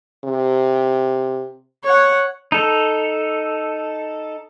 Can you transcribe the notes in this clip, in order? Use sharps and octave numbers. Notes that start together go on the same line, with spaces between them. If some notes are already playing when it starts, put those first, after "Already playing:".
C3
C#5 F#5
D#4 A4